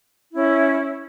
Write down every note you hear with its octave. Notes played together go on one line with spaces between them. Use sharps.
C#4 E4 E5